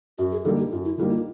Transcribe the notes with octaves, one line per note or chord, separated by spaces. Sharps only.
F#2 F#4
G#4
D3 G3 A#3 D#4 A4
G4
F#2 F4
E4
D3 G3 A#3 D#4 E4
F4